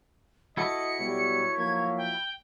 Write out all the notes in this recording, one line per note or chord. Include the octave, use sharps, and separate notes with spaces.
E4 F#4 A4 D#5 C#7
B2 F#3 G3 C#5
F3 F#3 A#3 G#6
G5